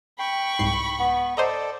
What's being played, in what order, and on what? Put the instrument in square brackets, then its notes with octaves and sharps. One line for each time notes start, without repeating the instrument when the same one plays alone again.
[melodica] G5 [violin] B5 C#6
[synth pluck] C2 G#2 C7
[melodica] B3
[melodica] A4 D5 [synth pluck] C5 D#5 A#5